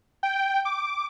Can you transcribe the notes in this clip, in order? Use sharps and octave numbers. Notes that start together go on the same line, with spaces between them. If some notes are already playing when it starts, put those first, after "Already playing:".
G5
D6